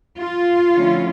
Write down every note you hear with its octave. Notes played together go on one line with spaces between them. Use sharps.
F4
D3 F3 A3 C#4 E4